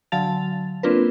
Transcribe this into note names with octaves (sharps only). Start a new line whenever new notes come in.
D3 F#3 F5 A5 A6 F7
A#3 C4 D4 F4 A#4 B4